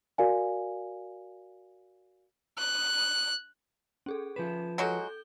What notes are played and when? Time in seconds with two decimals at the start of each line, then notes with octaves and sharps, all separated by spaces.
0.18 F#4 A#4 D5 F5 G#5
2.58 F#6
4.06 C#4 G#4 A4
4.36 F3 B4 E7
4.78 F#3 G#3 F#4 A4 G6 G7